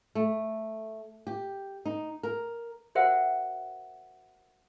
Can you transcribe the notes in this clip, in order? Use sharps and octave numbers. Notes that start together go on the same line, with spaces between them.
A3
G4
D#4
A#4
F#4 A#4 C5 E5 F#5 G5